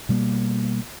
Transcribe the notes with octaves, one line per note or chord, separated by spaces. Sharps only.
B2 G3 G#3 A#3